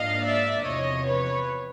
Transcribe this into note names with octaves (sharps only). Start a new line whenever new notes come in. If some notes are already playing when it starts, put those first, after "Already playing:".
Already playing: G#2 F3 A#3 D4 D#5 F5
D5 E5
E2 C3 F3 C#5 D#5
B4 C#5